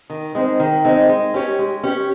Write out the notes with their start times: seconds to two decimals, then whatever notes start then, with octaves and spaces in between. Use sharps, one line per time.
0.10 D#3
0.35 G#3 C4 D#4
0.60 D#3
0.84 G#3 C4 D#4
1.09 G#3
1.34 C#4 G4 C#5
1.59 G#3
1.83 C#4 G4 C#5